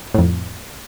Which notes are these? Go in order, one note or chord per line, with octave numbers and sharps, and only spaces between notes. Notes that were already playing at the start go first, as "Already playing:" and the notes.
F2 A2